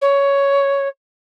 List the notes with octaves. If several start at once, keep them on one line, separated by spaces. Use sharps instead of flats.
C#5